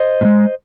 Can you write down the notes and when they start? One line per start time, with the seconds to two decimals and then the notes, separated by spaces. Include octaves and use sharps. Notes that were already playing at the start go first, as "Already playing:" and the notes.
Already playing: C5 D#5
0.21 A2
0.25 G#3